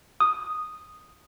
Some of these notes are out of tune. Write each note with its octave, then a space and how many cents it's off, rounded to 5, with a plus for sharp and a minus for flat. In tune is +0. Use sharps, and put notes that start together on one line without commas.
D#6 -5